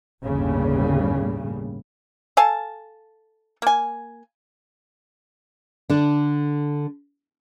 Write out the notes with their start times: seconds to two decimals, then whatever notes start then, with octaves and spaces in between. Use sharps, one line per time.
0.24 G1 D#2 A2 C#3 G3
2.37 A4 F5 G#5 A5
3.62 A#3 G#5
5.90 D3 D4